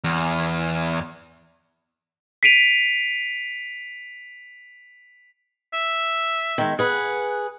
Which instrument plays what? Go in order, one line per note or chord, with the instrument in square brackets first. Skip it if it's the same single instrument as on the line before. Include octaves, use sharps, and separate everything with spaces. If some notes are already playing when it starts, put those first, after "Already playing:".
[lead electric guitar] E2
[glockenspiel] B6 C7 D7 D#7 F7
[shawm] E5
[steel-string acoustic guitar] D#3 G#3
[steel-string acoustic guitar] G#4 B4 [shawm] F#5